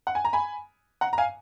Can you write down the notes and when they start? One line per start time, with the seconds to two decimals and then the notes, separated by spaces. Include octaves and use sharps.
0.07 F#5
0.15 G#5
0.25 A#5
0.33 G#5 B5
1.01 F#5 A#5
1.13 A#5
1.18 F5 G#5